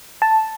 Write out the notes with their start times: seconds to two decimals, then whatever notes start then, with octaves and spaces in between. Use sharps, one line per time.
0.22 A5